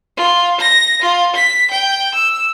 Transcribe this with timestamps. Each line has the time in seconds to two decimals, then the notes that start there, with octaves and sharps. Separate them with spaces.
0.17 F4
0.61 A#6
1.02 F4
1.35 B6
1.71 G5
2.14 E6